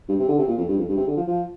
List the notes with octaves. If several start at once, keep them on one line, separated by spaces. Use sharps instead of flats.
G2
C3
D3
C3
A#2
F2
G2
F2
G2
C3
D3
F3
F3